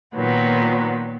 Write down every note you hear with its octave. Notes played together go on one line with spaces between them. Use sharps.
A#2 D#3 F#3 B3